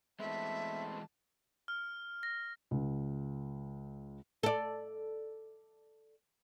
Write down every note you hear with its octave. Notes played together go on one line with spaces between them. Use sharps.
E3 G#3 A3 B3 C4 E5 A5
F6
A#6
C#2
A4 D5